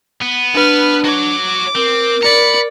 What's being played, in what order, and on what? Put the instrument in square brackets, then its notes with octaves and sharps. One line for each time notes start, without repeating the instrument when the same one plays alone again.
[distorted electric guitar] B3
[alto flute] D4 [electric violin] B4 F6
[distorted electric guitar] F#4 C#5 [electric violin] D6
[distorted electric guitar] C4 [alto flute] A#4
[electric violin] D5 C#7 [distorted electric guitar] A#5 B5